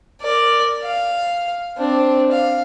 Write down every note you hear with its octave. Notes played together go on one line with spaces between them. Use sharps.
A#4 D5
F5
C4 D4
F5